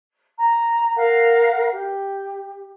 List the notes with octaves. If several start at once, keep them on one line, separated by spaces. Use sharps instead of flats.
A#5
A#4 F5 F#5
G4